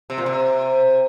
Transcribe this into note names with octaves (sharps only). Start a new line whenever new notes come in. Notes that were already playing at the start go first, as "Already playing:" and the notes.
C3
A#2
C3